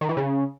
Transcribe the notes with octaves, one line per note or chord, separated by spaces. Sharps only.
D#3
E3
C#3